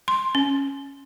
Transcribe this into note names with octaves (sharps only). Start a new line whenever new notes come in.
C6
C#4